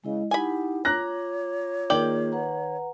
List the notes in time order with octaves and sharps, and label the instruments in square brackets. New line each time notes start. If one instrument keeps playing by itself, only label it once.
[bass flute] C#3 [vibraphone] G#3 E4 D#5
[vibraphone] D#4 E4 F#5 [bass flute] G4 [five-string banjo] G#5 B5
[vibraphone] F4 D6 [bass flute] C#5 [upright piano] A#5 F#6 A#6
[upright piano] D#3 F#7 [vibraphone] A#3 F4 G#4 [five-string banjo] D5 G5
[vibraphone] B4 F#5 A#5